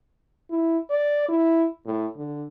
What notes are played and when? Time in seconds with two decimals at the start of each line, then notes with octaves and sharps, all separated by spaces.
0.50 E4
0.90 D5
1.28 E4
1.86 A2
2.16 D3